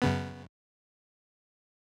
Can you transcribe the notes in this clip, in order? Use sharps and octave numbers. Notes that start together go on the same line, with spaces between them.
F#2 C#3 B3